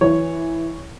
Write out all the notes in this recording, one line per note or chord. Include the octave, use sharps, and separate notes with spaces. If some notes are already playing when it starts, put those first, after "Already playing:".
E3 C#5